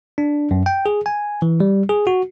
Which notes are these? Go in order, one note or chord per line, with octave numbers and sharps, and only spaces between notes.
D4
F#2
G5
G#4
G#5
E3
G3
G#4
F#4